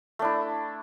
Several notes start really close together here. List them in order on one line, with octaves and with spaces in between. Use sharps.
A3 D4 E4